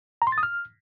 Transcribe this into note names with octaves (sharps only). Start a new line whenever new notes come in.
A#5
C6
A6
D#6
F6